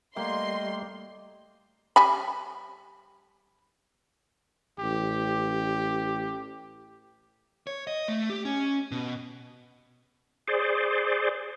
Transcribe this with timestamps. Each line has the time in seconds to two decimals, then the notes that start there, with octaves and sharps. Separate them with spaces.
0.16 G3 A3 A#3 D#5 G5 C6
1.96 G3 G#5 B5
4.79 A1 G4
7.67 C#5
7.87 D#5
8.08 A3
8.30 G4
8.45 C#4
8.92 B2
10.48 G#4 C5 D5